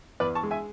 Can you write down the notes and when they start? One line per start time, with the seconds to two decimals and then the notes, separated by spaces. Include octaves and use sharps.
0.20 E2 B4 D5
0.35 A5 C#6
0.43 G#3
0.51 E5 G#5